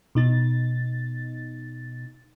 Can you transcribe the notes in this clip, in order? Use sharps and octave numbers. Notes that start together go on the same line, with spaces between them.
B2 D#4 A6